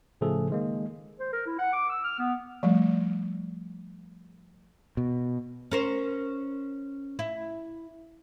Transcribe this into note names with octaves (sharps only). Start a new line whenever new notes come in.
A2 C#3 F3 A3 G#4 A4
D#3 G#3 A#3
C5
A#4
E4
F#5
D6
E6
F6
B3
F3 G3 A3
B2
C#4 A#4 C5
E4